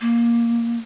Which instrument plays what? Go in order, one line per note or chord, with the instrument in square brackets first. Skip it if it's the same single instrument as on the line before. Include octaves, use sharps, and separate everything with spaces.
[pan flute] A#3